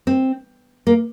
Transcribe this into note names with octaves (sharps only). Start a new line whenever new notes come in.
C4
A#3